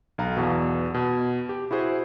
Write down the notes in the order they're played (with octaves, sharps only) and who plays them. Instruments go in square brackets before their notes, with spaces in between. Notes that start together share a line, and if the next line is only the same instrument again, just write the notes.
[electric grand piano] B1 F5 A#5
E2 B2
B2
G4
E4 F#4 G#4 C5